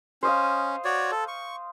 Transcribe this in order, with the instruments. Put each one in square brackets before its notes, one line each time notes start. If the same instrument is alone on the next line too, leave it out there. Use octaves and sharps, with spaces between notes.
[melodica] C#4 [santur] C5 D#5 F5
[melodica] F#4 C#5 D5
A4
C#6